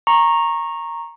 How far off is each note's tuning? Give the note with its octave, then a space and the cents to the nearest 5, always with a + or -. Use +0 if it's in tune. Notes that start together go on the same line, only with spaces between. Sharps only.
A#5 +0 C#6 -20